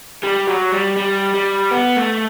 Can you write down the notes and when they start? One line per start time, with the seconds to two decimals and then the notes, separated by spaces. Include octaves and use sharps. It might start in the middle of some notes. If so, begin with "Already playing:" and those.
0.23 G3
0.47 F#3
0.72 G3
0.97 G3
1.34 G3
1.71 B3
1.96 A3